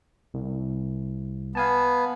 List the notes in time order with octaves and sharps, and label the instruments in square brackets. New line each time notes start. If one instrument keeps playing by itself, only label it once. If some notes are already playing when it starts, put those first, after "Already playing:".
[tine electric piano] C2
[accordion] B3 [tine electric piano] F5 G#5 A5